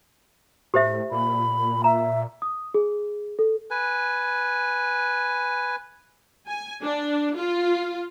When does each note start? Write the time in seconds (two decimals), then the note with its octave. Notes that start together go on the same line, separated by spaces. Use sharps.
0.74 A2 G4 C5 E5
1.11 A#2 B5
1.84 E5 A#5
2.42 D#6
2.74 G#4
3.39 A4
3.70 B4 G#5
6.46 G#5
6.82 D4
7.36 F4